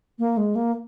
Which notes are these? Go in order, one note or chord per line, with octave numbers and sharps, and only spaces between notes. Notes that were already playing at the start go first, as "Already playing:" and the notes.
A#3
G#3
A#3